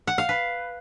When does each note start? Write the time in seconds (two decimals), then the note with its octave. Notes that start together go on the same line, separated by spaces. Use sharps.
0.07 F#5
0.18 F5
0.29 B4